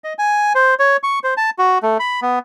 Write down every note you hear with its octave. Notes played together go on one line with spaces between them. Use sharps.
D#5
G#5
C5
C#5
C#6
C5
A5
F#4
A3
B5
B3